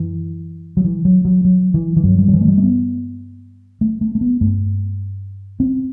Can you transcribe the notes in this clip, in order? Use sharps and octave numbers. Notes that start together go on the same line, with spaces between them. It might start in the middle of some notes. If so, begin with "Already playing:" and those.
Already playing: F#2 E3
F#3
E3
F#3
F#3
F#3
E3
E3
G2 F#3
G3
F#3
E3
A3
G3
A3
B3
A3
A3
A3
B3
G2 A3
C4